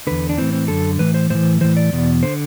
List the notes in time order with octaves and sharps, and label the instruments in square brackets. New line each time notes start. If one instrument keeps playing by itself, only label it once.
[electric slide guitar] E2 D3 B4
D4
A2 E3 C4
C4
F#2 D3 A4
A2 E3 B4
C5
A2 E3 C5
A2 E3 C5
D5
E2 B2
D3 C5